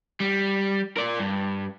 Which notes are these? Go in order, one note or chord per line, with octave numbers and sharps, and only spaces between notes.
G3
A#4 D5
G2